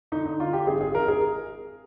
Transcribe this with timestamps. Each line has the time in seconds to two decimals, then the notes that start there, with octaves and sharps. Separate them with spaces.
0.12 D3 D#4
0.26 D#4
0.40 D3 F4
0.53 G4
0.67 G#1 G#4
0.81 G#4
0.95 G#1 A#4
1.08 G#4